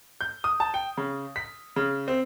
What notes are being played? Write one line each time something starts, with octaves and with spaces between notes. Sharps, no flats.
G6
D#6
A5
G5
C#3
B6
C#3
C4